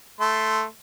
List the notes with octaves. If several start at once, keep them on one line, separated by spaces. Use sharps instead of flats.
A3 C6